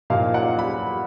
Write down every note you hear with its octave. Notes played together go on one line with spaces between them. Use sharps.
A#2 F3 A#3 D#4 F5
F#5
B5